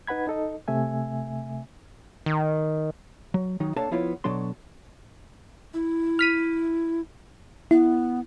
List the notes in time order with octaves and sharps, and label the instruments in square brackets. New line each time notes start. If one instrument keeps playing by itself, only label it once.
[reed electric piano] D#4 B4 F#5 B5 G#6
D#4 A4 D#5
C3 A3 E5 G#5
[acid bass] D#3
[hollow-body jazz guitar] F#3
D#3 F#3 D#4
A#3 D4 A4 C#5 F5 A5
F3 B3 E4 F4 C#5
B2 F#3 D4 A4 C6
[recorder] E4
[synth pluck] F6 B6 D#7
[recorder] B3 [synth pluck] E4